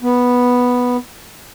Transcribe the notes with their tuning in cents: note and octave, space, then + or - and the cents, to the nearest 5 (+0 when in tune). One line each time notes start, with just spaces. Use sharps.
B3 -5